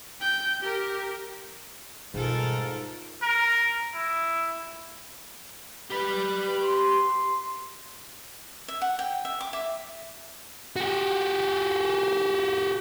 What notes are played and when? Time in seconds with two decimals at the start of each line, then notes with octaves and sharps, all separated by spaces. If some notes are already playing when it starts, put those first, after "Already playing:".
0.20 G5 G6
0.60 G4 A#4
2.14 G#2 B2 G3 F4 A4 A#4
3.22 A#4
3.94 E4
5.91 G4 B4 B5
6.62 C6
8.68 E5
8.82 F#5
8.99 G5
9.25 E5
9.41 D6
9.53 E5
10.76 F#4 G4